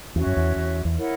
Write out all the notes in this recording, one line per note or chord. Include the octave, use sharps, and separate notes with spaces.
E2 C#4 F#4 C#5 E5
F#2
E2
E2
E2
E4 A#4 C#5 F#5